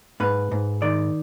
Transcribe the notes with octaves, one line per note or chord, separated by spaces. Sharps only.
G#2 B4
G#2
D#3 D5